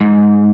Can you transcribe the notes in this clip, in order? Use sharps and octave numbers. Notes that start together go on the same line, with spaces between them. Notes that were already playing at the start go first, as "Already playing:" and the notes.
G#2